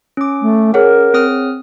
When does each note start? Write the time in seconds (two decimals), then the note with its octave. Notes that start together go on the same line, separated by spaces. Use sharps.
0.17 C#4 D6
0.42 A3
0.74 G#4 A#4 C#5 F#5
1.14 C4 D#6 F6